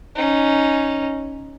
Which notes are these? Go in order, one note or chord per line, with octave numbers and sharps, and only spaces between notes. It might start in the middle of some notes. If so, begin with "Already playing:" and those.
C#4 D#4